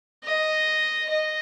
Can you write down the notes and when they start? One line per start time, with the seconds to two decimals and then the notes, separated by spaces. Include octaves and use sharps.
0.24 D#5
1.10 D#5